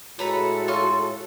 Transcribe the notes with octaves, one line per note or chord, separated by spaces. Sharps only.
A2 G#3 F#4 A4 B4 C#5 A#5 B5
F4 C#5 C6 C#6